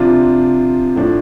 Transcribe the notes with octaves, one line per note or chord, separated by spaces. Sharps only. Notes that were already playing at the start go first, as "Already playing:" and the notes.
Already playing: C3 F3 D4 F4
A2 F3 D4